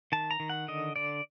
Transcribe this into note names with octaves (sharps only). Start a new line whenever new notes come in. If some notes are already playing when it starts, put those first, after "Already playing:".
D#3 A5
A#5
D#3
F#5
D3 D#5
D3 D5